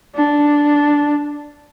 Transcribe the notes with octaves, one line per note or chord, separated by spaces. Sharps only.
D4